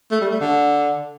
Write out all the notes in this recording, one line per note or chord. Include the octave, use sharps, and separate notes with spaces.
A3
G3
A3
D3